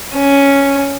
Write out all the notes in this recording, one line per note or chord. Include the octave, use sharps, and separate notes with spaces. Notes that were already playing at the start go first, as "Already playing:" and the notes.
C#4